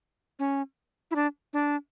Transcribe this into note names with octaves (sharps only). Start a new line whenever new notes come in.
C#4
E4
D4
D4